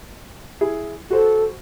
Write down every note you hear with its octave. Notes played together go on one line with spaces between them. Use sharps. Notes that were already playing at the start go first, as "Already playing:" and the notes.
E4 G#4
F#4 A4 C5